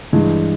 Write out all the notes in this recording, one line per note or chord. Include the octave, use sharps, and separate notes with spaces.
G2 E3 G#3